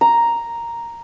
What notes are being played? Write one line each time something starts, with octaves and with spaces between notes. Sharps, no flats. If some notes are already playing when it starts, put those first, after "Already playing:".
A#5